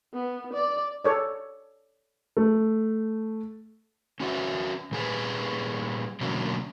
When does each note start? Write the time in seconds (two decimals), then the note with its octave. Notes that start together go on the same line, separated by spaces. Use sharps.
0.14 B3
0.53 D5
1.04 A4 C#5 D5
2.37 A3
4.20 C#4 F#4 B4 E5
4.91 A#2 G3 G#4 B4
6.21 B2 D3 F#3 A#3 C#4